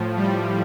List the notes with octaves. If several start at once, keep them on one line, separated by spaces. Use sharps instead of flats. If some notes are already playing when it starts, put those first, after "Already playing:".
Already playing: A2 F3
G3